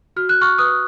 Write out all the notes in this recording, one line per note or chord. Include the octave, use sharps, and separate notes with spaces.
F#4 F6
F#6
C#6 F6
B4 D#6 F#6